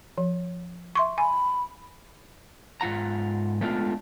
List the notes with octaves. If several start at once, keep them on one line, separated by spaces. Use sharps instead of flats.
F3
E5 C6 C#6
G#5 B5
G#2 F4 F#5 A#5
G#3 A3 B3 D4 F4